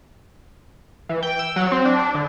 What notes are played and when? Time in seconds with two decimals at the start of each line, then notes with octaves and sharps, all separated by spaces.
1.09 E3
1.23 G5
1.39 E6
1.56 F#3
1.72 C4
1.85 D4
1.99 D4
2.15 D3